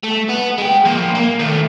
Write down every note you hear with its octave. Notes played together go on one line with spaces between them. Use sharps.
A3
B3
G#3 G5
F3 A#3
A#3
D#3 A3